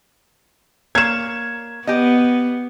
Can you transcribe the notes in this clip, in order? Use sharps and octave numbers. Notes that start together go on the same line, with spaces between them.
A#3 C#5 G#6 E7
B3 G4 D#5